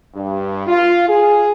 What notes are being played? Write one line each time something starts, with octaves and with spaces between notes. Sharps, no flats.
G2
F4
G#4